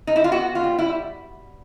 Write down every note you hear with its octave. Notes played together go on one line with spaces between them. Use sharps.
D#4
E4
F4
B3 F#4
F4
G3
E4